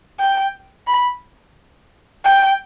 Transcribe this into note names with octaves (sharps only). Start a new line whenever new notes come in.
G5
B5
G5